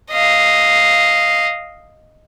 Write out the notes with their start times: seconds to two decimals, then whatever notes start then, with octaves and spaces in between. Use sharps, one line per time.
0.11 D#5 F5